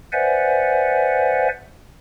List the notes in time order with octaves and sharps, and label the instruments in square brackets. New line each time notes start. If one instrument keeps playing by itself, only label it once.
[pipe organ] B4 C5 D5 E5 F#5 G#5